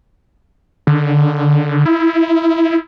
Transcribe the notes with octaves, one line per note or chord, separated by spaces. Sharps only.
D3
E4